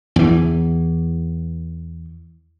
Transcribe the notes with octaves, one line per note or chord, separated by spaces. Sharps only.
E2 E3